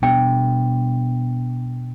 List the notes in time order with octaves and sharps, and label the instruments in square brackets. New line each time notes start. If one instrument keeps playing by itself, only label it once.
[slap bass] B2 G3 B3 D4 [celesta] G5